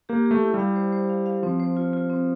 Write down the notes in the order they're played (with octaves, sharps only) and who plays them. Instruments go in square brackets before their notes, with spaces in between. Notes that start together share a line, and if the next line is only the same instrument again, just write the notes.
[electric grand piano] A#3 [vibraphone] G4
[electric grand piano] A3 [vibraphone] G4
[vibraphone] E4
[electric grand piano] G3
[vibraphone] F5
C5
C5
F5
F5
[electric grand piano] F3 [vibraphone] C4
[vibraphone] C5
F4
F4
C4